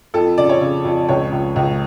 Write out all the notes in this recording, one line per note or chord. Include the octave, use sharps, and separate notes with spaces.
F2 A4
C#3 D5
C#5
C#3
F2
C#2 C#5
C#2
C#2